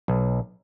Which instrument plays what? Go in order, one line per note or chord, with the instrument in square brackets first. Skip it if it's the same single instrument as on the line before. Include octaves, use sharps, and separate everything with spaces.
[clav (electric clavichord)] B1